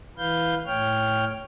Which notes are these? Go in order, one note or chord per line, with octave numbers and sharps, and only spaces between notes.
E3 B4 F5 G6
A2 C#5 G5 F6